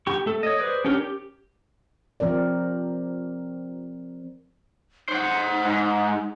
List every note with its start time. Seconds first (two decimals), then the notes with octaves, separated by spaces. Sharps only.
0.07 G4 C#6
0.26 A3 A4
0.43 C#5 D#5
0.59 G#4 B4 C5 D5
0.85 C#4 D4 G4 A#4 C#5
0.96 G4
2.20 F3 C4 A#4 D5
5.08 D#4 C5 F#5
5.65 G#2